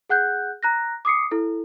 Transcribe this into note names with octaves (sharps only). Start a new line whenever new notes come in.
G#4 F#5 F#6 G6
A#5 F#6 A#6
D6 D#6 C7 C#7
E4 A4